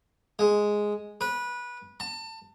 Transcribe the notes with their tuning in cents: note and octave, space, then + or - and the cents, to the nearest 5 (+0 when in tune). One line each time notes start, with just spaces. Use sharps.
G#3 +0
B4 -20
A5 +30